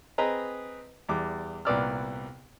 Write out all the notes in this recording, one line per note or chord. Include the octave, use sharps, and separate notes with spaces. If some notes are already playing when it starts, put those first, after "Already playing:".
C4 G#4 B4 D#5 A#5
E2 G3 D6
C2 A#2 B3 D5 E6 F6